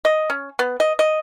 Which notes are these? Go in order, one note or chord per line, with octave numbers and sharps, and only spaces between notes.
D#5
C#4
B3
D#5
D#5